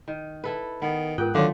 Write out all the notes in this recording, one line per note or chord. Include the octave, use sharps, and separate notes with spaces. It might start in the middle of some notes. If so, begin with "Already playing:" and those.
D#3
E4 A4 B4
D#3 B3
G#2 F4 G#4 A#4 G5 D#6 F#6
D3 D#3 F#3 A3 C#5 F5 C6